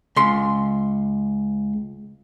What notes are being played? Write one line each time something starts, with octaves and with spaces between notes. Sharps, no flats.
C#2 C6